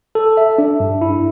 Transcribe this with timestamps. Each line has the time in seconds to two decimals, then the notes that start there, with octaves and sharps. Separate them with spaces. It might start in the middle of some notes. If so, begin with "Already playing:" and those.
0.15 A4
0.37 E5
0.58 D4
0.80 G2
1.01 E4